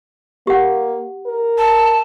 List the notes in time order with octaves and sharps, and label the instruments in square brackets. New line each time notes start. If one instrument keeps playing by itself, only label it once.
[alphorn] A#3 [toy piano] G4 F#5
[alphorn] A#4
[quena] A5